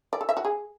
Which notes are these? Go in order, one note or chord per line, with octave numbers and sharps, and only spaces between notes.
D5
A4
E5
F#4
G#4